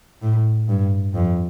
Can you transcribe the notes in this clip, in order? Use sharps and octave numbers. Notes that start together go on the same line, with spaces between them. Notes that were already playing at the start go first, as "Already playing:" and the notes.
A2
G2
F2